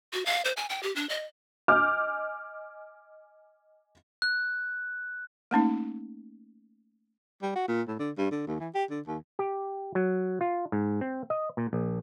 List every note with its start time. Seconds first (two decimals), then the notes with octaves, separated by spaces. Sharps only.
0.13 F#4
0.26 F5
0.45 C5
0.57 G#5
0.69 G5
0.83 G4
0.96 D4
1.09 D#5
1.68 D#5 G#5 D6 F6 G6
4.22 F#6
5.51 A3 A#3 C#4 D#4
7.42 G3
7.56 F#4
7.68 A#2
7.88 A2
7.99 D3
8.18 G2
8.31 D3
8.47 D#2
8.60 E3
8.75 G4
8.90 D3
9.07 D#2
9.39 G4
9.95 F#3
10.41 F4
10.72 G#2
11.01 C4
11.30 D#5
11.57 A#2
11.73 A#1